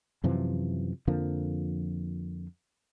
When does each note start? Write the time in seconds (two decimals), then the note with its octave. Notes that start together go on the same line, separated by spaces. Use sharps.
0.24 F#2 C3 E3 F3
1.07 F2 D3 F3 A#3